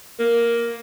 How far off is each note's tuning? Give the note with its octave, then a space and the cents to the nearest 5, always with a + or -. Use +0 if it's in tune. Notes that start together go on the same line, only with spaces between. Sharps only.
A#3 +5